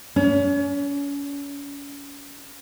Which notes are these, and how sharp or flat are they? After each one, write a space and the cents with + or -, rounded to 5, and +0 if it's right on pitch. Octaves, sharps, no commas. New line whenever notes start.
C#4 +35